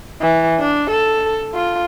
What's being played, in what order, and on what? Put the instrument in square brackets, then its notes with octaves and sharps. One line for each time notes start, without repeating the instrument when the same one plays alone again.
[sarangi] E3
D4
A4
F4